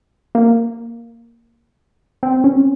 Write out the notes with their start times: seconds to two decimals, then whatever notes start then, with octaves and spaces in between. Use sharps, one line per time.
0.35 A#3
2.23 C4
2.44 C#4